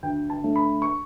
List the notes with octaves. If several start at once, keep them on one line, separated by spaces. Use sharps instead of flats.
D2 G5
A5
D3 A3
B5
C#6